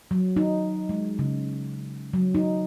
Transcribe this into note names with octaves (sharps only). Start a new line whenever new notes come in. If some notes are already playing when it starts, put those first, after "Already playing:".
F#3
D#4
G#3
C#3
F#3
D#4